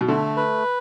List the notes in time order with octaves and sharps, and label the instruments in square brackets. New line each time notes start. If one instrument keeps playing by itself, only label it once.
[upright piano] B2
[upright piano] D3 [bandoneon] A3
[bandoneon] B4